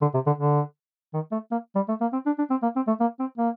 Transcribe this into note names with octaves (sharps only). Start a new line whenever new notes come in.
D3
C3
D3
D3
D#3
A3
A#3
G3
A3
A#3
C4
D4
D4
C4
A#3
C4
A3
A#3
C4
A#3